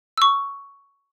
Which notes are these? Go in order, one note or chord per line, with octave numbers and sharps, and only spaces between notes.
C#6 E6